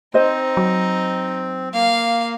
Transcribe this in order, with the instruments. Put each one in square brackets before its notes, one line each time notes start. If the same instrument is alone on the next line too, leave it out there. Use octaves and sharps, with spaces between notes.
[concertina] C4 [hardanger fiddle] D#4 [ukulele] C5 D#5
[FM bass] F#3
[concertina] A#3 [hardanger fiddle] F5